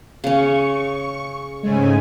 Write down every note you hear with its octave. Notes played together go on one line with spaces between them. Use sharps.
C#3 C#4 C#6
G#2 C#3 G#3 A3 C#4 G#5